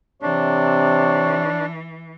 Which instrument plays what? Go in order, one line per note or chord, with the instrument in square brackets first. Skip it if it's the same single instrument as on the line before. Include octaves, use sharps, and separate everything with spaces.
[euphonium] C3 [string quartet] E3 [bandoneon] D4 [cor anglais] C#5